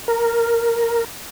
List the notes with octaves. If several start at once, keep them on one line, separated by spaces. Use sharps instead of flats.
A#4